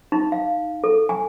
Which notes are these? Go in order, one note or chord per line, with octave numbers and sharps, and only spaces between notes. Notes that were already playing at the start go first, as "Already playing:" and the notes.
D#4
F5
A4
G#5